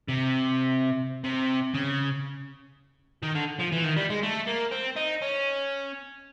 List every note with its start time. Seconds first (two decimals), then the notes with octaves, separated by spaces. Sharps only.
0.08 C3
1.24 C3
1.74 C#3
3.23 D#3
3.35 D3
3.60 F3
3.72 E3
3.85 D#3
3.97 G3
4.10 G#3
4.23 A3
4.47 A#3
4.71 C4
4.96 D#4
5.22 C#4